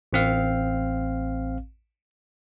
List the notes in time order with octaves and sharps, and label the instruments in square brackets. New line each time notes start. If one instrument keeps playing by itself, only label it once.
[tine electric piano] A1 C4 F5